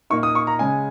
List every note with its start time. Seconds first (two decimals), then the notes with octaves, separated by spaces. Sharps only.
0.10 A#2 A#3 D#4 C#6
0.23 D#6
0.35 C#6
0.47 A#5
0.59 C#3 G#3 C#4 G#5